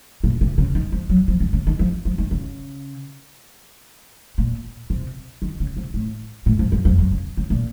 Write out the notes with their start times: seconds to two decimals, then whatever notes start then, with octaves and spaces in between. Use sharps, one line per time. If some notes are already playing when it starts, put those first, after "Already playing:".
0.24 A#2
0.41 C3
0.58 C#3
0.75 D#3
0.92 F3
1.10 F#3
1.28 F3
1.40 C#3
1.53 C#3
1.67 D#3
1.79 F3
2.05 F3
2.18 D#3
2.31 C#3
4.38 A#2
4.90 C3
5.42 D#3
5.60 C#3
5.77 C3
5.94 A2
6.46 A2
6.59 F2
6.72 F#2
6.85 F2
6.98 F#2
7.11 C#3
7.37 C#3
7.50 A#2